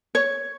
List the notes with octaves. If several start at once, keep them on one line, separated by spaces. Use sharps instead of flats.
C#5